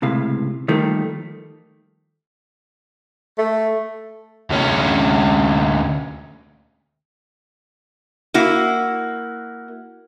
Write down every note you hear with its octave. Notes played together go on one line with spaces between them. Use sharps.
C#2 A2 C3 F5
D#3 F3 G3 A3 A#3
A3
D2 C#4
A#3 E4 F#4